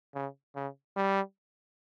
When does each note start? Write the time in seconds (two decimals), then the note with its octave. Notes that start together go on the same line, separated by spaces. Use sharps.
0.14 C#3
0.55 C#3
0.96 G3